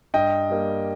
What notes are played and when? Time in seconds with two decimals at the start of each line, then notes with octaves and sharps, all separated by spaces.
0.14 G2 D#5 G5
0.50 G3 A#3